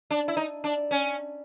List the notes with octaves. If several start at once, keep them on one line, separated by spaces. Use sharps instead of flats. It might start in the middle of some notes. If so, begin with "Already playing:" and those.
D4
E4
D#4
D4
C#4